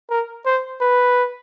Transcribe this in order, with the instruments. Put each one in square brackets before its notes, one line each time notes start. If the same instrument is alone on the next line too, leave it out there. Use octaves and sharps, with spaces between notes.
[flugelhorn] A#4
C5
B4